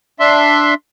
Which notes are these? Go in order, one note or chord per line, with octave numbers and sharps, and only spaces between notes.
D4 E5 C6